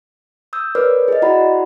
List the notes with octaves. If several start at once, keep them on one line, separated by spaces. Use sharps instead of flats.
D#6 E6 G6
A#4 B4 C#5 D5 D6 F6
G#4 D#5
E4 F#4 D5 F#5 A#5 B5